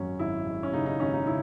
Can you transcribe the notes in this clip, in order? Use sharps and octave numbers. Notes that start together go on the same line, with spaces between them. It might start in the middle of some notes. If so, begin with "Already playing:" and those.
Already playing: G#1 F#2 C#4
G#1 E4
G#1
C#4
C#3 D#4
D#4
G#1 C#4
D#4
C#3 E4